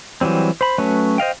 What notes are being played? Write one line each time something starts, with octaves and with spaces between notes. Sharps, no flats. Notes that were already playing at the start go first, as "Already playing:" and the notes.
E3 F#3 G3 C4
C5 B5
F#3 A3 C#4 B4
C5 D#5 F5 G5